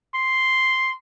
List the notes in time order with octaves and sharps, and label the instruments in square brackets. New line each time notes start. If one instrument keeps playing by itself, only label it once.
[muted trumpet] C6